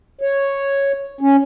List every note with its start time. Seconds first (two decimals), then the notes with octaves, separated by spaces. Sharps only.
0.21 C#5
1.21 C#4